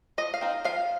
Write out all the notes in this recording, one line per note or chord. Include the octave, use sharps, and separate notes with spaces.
F3 D#5
F5
C4 D#4
F3 F5